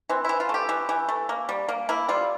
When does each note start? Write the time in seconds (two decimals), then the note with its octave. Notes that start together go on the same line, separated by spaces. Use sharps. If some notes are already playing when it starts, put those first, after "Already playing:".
0.09 E3 C4
0.25 E3 E4
0.40 F4
0.49 A3 G4
0.69 E3
0.89 E3
1.09 A3
1.29 A#3
1.49 G3
1.69 A#3
1.89 A#3 E4
2.09 G3 F4